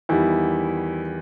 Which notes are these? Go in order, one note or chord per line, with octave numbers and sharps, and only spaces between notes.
E2 D#3 G3 E4